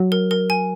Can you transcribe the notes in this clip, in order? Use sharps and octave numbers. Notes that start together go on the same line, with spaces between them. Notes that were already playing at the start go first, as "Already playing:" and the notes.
Already playing: F#3
A#4
A#4
G#5